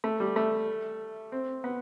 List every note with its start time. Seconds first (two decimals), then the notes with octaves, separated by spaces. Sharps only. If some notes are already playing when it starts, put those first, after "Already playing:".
0.04 A3
0.20 G3
0.36 A3
1.32 C4
1.64 B3